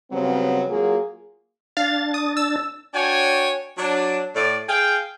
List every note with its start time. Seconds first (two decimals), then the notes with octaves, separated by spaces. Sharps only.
0.11 C#3 F#3 G3 B3 C4
0.70 F#3 A#3 F4 F#4 G#4
1.77 D4 F5 A6
2.14 D#6
2.37 E6
2.94 D4 F#4 C#5 G5 G#5
3.78 F#3 D4
4.35 A2 D5
4.68 G#4 F5 G5